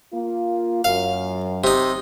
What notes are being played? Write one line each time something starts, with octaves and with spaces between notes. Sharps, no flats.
A#3 F4
F#2 F5
C3 D#4